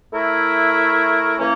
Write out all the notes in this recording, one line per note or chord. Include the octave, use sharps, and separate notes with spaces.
A3 E4 A#4 C#5 E5
E3 A#3 C#4